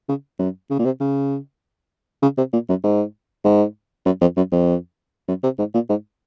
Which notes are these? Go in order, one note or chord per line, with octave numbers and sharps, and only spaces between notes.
C#3
F#2
C#3
A#2
C3
C#3
C#3
C3
A#2
F#2
G#2
G#2
F#2
F2
F#2
F2
F#2
C3
G#2
A#2
G#2